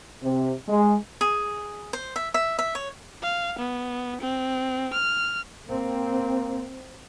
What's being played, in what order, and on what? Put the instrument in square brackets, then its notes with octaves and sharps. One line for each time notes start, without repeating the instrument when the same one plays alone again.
[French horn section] C3
G#3
[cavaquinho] G#4
C5
E5
E5
E5
C#5
[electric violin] F5
B3
C4
F6
[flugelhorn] A#3 [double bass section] C4